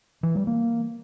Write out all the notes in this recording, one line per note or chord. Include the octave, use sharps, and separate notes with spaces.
E3
G3
A#3